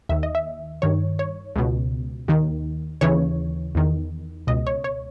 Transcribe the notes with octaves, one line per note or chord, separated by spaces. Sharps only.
D#2 D#3 E5
D#5
E5
G2 D#3 C#5
C#5
C#2 B2
D#2 D#3
D#2 C#3 E3 C#5
E2 D#3
C#2 B2 D#5
C#5
C#5